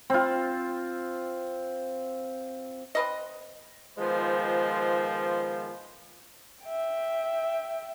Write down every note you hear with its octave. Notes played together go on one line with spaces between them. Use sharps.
C4 F4
C4 B4 D#5
D#3 F3 G#3 B3 F4 C5
E5 G5